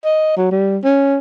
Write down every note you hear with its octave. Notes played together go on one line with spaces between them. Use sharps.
D#5
F#3
G3
C#4